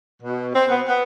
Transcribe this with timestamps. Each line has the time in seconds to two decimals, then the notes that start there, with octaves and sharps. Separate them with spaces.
0.21 B2
0.54 C4
0.68 B3
0.87 B3